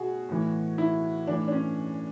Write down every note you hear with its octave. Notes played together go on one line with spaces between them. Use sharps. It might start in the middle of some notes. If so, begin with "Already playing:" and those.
Already playing: B2 F#4 G#4
A2 E3
E4
A2 E3 D4
D4
C#4